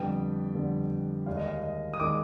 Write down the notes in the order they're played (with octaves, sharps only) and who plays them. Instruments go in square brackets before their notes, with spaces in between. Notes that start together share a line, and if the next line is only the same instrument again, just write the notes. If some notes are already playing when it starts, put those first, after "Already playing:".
Already playing: [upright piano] F2 D3 G3 B3 G5
F2 D3 G3 B3
D#2 D#3 G#3 F5
D#5
F5
D#5
D#6
D#3 G#3 D6